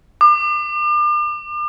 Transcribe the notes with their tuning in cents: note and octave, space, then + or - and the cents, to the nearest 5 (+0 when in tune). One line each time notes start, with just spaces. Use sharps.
D6 +40